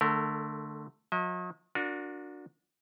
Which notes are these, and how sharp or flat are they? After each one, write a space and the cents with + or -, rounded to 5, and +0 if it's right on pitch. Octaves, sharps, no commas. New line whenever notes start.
D3 +15 A3 +0 A#4 -15
F#3 -45 D#5 +45
D4 +0 F#4 -35 A#4 -5